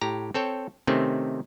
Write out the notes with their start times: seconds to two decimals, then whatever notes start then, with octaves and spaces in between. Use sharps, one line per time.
0.01 A2 G4 A#5
0.34 C4 A4 C#5 G5
0.87 C3 D#3 A3 C4 C#4